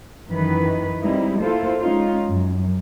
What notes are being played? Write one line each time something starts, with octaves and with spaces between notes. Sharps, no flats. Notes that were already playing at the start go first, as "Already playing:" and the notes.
F#2 D#3 E3 B4
G3 G#3 C4 D#4 E4
A#3 E4 F4 A4 C5
G#3 C#4 D#4 F4
F#2